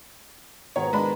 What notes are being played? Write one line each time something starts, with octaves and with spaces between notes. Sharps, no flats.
G#2 B2 D#3 C#5
G#3 D4 B5